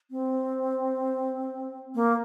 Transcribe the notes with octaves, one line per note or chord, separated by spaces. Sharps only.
C4
A#3